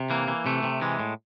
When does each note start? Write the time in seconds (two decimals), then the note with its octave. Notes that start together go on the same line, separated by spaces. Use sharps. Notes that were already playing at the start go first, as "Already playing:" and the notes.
Already playing: C3
0.10 E3 A#3
0.28 E3
0.46 C3 A3
0.63 C3
0.81 E3 G#3
1.00 A2